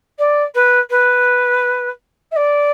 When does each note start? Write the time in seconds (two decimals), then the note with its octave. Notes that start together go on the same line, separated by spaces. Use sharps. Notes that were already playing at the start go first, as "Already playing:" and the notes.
0.18 D5
0.54 B4
0.90 B4
2.31 E5
2.36 D5